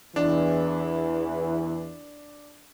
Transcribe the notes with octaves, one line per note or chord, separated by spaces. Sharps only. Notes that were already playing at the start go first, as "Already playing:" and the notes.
E2 E3 D4